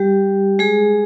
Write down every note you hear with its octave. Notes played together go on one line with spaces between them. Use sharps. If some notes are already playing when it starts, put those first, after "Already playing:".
Already playing: G3 G4
G#3 G#4